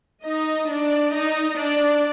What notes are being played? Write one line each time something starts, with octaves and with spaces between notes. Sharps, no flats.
D#4 D#5
D4 D5
D#4 D#5
D4 D5